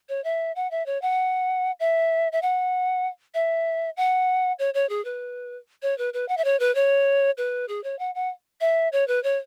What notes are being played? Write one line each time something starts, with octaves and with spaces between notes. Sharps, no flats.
C#5
E5
F#5
E5
C#5
F#5
E5
E5
F#5
E5
F#5
C#5
C#5
G#4
B4
C#5
B4
B4
F#5
E5
C#5
B4
C#5
B4
G#4
C#5
F#5
F#5
E5
C#5
B4
C#5